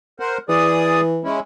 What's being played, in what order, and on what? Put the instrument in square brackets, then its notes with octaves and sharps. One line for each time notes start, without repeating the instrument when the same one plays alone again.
[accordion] A#4 C5 F#5
[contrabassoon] E3 [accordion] G#4 D5 D#6
[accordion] G#3 C#4 E4